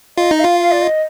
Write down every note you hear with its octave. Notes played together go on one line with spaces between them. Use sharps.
F4 D#5
D#4
F4 F5
F5
D5
D#5